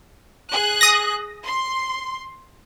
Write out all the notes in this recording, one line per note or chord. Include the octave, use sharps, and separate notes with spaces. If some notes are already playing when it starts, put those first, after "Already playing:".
G#4 F#6
D#6 A#6
C6